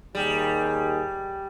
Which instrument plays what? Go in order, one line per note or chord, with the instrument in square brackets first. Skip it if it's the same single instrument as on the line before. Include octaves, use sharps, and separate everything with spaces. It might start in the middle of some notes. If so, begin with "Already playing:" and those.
[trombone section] D#2 D#3 G#4 [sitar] G3